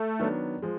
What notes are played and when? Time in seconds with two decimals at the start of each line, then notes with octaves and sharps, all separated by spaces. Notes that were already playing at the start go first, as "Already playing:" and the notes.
Already playing: A3
0.19 D#3 F#3 B3 D4
0.62 F3 G#3